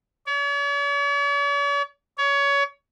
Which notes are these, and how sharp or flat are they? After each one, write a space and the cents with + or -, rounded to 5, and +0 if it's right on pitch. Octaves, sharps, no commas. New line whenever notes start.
C#5 +45
C#5 +25